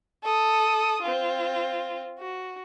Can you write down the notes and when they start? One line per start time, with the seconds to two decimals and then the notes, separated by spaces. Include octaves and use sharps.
0.24 A4 D#6
1.03 C4 F4
2.19 F#4